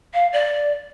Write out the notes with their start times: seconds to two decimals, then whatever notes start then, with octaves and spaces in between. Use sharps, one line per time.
0.13 F5
0.32 D5